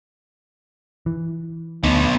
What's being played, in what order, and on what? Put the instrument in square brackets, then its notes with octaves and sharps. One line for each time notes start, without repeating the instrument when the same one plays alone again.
[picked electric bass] E3
[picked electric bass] D2 [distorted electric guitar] B3 D#4